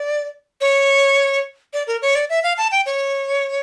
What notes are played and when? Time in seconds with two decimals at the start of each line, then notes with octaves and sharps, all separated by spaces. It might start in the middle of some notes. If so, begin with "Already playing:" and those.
Already playing: D5
0.61 C#5
1.73 D5
1.87 A#4
2.02 C#5
2.15 D5
2.30 E5
2.44 F5
2.58 A5
2.72 G5
2.86 C#5